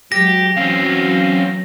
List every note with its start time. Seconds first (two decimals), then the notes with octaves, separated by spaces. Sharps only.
0.12 F#3 G#3 G4 A#6
0.57 E3 F#3 C4 C#4 F5